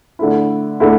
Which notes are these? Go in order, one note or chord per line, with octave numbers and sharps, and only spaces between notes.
D3 A3 E4
D3 A3 E4